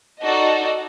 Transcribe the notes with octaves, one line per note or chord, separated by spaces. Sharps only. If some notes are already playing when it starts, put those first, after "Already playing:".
D#4 F#4 A4 D5 D#5